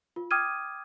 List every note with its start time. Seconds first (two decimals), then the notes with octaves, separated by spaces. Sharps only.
0.16 F4
0.31 G5 D6 D#6 F6 G#6 D#7